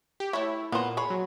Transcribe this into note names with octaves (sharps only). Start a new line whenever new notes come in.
G4
A3 E4 C#5
A#2 B3 C5
G#4 C#5 B5
F#3